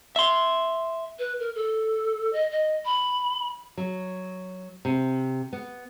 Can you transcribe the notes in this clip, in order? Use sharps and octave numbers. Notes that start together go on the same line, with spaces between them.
E5 C6
B4
A#4
A4
D#5
D#5
B5
F#3
C3
B3